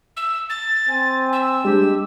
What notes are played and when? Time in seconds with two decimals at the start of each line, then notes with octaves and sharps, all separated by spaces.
0.17 E6
0.50 A6
0.89 C4 G#5
1.33 E6
1.64 G3 G#3 D4 G4